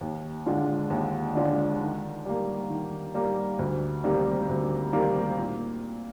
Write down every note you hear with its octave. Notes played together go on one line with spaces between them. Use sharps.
D#2
D3 G#3 D4 F4
D#2
D3 G#3 D4 F4
D#3
G3 A#3
D#3
G3 A#3
D2
C3 D#3 G3 A#3
D2
C3 D#3 G3 A#3
A#2